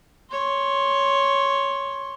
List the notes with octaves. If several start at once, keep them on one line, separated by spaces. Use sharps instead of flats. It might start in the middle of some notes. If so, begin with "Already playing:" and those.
C#5 C6